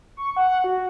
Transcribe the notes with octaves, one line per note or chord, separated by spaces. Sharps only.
C#6
F#5
F#4